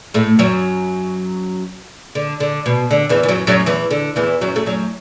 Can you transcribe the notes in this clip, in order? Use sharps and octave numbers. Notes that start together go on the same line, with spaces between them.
A2 A3
F#2 F#3
D3
D3
B2
D3
E2 E3
E3
F#2 F#3
F#2 F#3
E2 E3
D3
E2 E3
F#2 F#3
A3
F#2 F#3